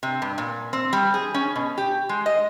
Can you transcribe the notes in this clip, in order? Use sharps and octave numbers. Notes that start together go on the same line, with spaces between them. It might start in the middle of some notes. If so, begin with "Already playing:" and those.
C3
G2
A#2
C4
G3
G#4
C#4
B2
G4
G#3
D#5